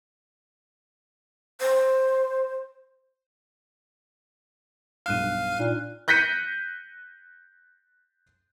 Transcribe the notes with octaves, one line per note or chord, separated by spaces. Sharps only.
C5
B1 G2 F5 F6 F#6 D#7 E7
A#2 D4 D#4 D5
F#6 G6 A#6 B6 C#7 D#7